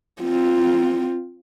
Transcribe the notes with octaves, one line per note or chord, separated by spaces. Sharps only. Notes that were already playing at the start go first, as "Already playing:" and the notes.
C4 F4